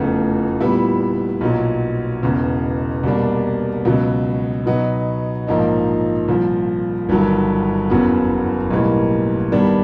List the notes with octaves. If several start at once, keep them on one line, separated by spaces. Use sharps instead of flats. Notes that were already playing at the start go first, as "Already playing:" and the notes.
Already playing: F1 E2 C#3 F3 A3
A#2 G3 B3 E4
B1 A#2 F#3
E1 E2 C#3
C2 B2 G3 A#3 D4
C#2 B2 F#3
B2 F#3 B3 D#4
A#1 G#2 F3 A#3 D#4
C2 A#2 F3
G1 G2 D#3 F#3
F#1 E2 C#3 F#3 B3
B1 A2 E3 G3 A#3
G2 D#3 G3 B3 D4